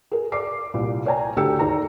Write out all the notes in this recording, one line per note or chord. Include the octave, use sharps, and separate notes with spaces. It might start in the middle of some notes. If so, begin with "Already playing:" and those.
G#4 A#4
D5 D6 C7
C2 A#2
C#5 D5 G5 G#5 A#5
D2 A3 G4 G5 E6 C#7
D#2 G#4 D5 A#5